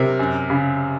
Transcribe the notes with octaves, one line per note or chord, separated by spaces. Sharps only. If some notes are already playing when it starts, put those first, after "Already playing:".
Already playing: C3 A#4
F#2
C#3